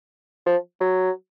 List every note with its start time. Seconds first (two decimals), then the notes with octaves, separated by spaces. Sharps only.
0.46 F3
0.80 F#3